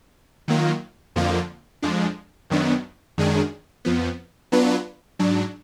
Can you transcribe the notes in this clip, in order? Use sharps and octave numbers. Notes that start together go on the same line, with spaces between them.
D#3 F#3 A#3 F4
F2 D3 F3 A#3 F4
F2 F3 G#3 D4
F#2 D#3 F#3 B3 D4
F#2 D#3 G#3 D4 G#4
F2 F3 B3
F#3 B3 D4 F4 B4
G#2 F#3 D4